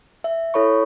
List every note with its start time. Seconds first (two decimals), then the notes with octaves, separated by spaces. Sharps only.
0.24 E5
0.54 E4 A4 C#5 B5 C#6